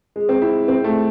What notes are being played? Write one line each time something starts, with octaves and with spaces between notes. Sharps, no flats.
G#3
C4
E4
C4
A3